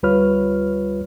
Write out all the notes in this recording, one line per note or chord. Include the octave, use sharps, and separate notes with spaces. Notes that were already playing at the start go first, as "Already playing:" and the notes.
D2 G3 F4 B4 C#5 F6